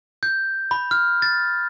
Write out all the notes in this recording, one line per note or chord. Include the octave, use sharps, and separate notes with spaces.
G6
B5
F6
A6